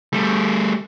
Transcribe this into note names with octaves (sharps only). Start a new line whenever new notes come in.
G3 A3